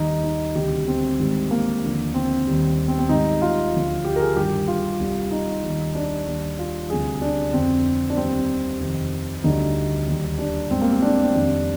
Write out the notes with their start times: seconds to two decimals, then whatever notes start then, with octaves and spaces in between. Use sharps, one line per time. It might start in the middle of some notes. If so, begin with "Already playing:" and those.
Already playing: D#2 D#3 G3 D#4
0.24 D#4
0.55 D2 C3 D#3 G3 G4
0.88 C4
1.19 G#2 D#3 G3
1.51 A#3
1.82 D#2 D3 F3
2.14 C4
2.46 D#2 D#3 G3
2.88 C4
2.99 C4
3.09 G#2 D#3 G3 D#4
3.42 F4
3.72 D2 D3 F3
4.05 G4
4.16 A#4
4.20 G#4
4.36 G2 D#3 G3 G4
4.68 F4
4.99 C2 C3 G3
5.31 D#4
5.63 D#2 D#3 G3
5.95 D4
6.27 D#2 D#3 G3
6.59 F4
6.90 D2 C3 G3 G#4
7.22 D4
7.53 F2 D3 F3 C4
8.10 D4
8.17 D#2 D#3 G3 C4
8.80 F2 C3 D#3
9.44 D2 D3 G3 D#4
10.07 D#2 D#3 G3
10.38 D4
10.70 G#2 G3 C4
10.81 A#3
10.92 C4
11.02 D4
11.23 C4
11.34 F2 D#3 G3 D4